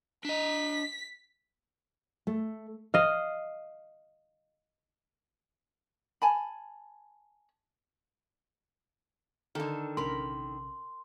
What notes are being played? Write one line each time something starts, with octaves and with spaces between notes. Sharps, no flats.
D4 D#5 B6
A3
D#5 F5
G#5 A5 B5
D3 D#3 A4
A#1 C3 C#4 A#4 B5 C6